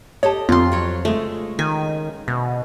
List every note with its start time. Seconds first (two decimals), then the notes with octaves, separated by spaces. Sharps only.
0.23 G4 A4 C#5 D#5 A5
0.49 F2 B3 C4 F4 C6
0.72 F#3 C#5
1.05 C#3 G#3 A3
1.59 D#3 G#5
2.28 D2 B2